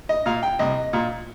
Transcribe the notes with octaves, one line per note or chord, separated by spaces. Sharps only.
D#5
A#2 F5
G5
C2 D#5
A#2